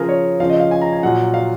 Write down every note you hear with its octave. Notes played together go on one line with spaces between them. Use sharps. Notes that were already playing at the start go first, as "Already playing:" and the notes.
Already playing: C#3 F3 G#4 A#4
C#5
C#3 F3 F5
D#5
F5
G#5
A#5
G#5
A#2 F#3 F#5
F5